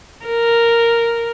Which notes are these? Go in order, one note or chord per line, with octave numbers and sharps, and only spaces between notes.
A#4